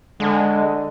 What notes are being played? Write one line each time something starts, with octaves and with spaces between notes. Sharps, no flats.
D3 G#3